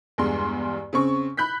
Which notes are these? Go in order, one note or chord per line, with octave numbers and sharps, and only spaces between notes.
E2 G2 G#3 C6
C#3 C4 C#6
B5 F#6 G6 B6